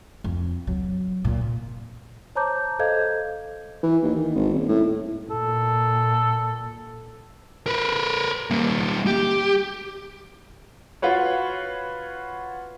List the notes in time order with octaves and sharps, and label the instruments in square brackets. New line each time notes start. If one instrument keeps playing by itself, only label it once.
[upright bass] F2
F#3
A#2
[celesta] C5 C#5 A5 A#5 D6 G6
A4 C5 D#5 F5 G6 G#6
[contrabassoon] E3
D#2
D#3
G#1
D#1
A2
[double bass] A#2 [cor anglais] A4
[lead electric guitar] A#4 B4
G3 A#3
G4
[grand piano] F4 F#4 B4 C#5